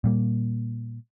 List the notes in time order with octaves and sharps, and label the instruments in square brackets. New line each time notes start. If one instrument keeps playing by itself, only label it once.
[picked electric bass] A#2 G3 A#3